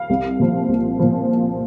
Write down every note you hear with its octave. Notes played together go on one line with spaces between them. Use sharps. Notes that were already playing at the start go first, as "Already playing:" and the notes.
Already playing: F5
C2
A#2 F3
C2
A#2 F3